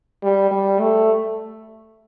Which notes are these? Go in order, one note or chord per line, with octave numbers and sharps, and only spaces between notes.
G3
G3
A3